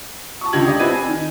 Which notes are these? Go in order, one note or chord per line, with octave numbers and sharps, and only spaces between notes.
A5 C#6
C#2 D3 G4 D#5 G#6 F#7
G4 D5 D#5
C4 E4 B4 G#6 D#7
G#5
D#3